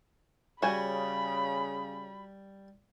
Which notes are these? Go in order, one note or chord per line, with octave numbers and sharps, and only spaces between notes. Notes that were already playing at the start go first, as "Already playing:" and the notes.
C#3 G3 F#4 G#5 B5